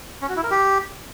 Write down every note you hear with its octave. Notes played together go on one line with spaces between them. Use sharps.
C#4
F#4
E4
A#4
G4